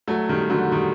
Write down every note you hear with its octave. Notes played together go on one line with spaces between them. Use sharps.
F#3 A3
D#3 G3
D3 F#3
D#3 G3